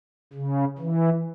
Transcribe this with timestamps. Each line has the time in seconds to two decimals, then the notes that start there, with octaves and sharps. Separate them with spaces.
0.33 C#3
0.79 E3